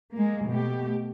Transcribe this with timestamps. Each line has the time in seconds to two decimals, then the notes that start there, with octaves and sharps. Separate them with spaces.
0.13 G#3 A#3
0.48 B2 A3 G4